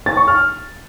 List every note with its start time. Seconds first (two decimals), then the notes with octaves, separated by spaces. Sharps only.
0.06 A6
0.17 C#6
0.27 F6